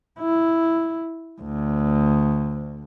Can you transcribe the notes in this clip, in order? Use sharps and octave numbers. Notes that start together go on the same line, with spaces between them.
E4
D2